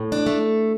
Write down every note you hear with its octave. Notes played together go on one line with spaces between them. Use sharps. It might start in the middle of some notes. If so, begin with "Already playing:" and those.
Already playing: A2
D4
A3